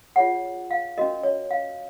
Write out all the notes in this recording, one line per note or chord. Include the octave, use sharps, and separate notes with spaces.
F4 G#4 C#5 F#5
F5
C#4 F#4 A#4 D#5
C#5
F5